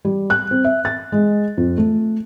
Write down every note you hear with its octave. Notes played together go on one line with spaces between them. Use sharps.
G3
F#6
C4
E5
A6
G#3
F2
A3